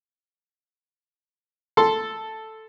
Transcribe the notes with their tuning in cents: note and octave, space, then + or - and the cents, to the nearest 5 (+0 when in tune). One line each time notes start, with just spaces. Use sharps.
A4 +0 C6 +0